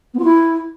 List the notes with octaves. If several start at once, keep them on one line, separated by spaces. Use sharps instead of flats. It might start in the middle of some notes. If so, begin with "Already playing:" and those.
B3
F4
E4